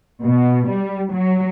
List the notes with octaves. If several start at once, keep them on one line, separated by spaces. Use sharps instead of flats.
B2
G3
F#3